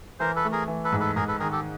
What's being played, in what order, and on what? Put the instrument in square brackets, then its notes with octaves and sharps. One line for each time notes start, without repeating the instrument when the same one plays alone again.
[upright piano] E3 [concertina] A#4 C5
[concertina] A4 B4
[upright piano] A3
[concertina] G#4 A#4
[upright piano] E3
[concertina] A4 B4
[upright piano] G#2
[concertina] A4 B4
[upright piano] G#2 [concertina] G#4 A#4
[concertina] A4 B4
[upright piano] D#3 [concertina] G#4 A#4
[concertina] G4 A4